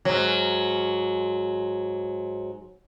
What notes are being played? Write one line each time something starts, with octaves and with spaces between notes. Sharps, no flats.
G#2 F#3